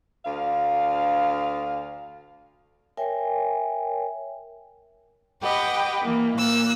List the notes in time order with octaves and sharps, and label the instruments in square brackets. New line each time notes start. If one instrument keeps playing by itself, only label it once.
[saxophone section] D2 F5
[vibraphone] A#4 C#5 E5 G5 G#5
[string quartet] G4 B4 D#5 F#5 G5
E3 A#3
A#2 A#3 E6 F#6